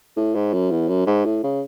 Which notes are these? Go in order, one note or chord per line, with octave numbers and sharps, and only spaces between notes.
A2
G#2
F#2
E2
F#2
G#2
A2
C#3